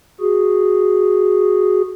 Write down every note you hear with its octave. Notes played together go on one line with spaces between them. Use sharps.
F#4 G#4